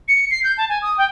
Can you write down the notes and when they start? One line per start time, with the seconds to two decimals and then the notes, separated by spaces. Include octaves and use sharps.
0.08 C#7
0.31 C7
0.44 G6
0.58 A5
0.69 G#5
0.82 D#6
0.98 G5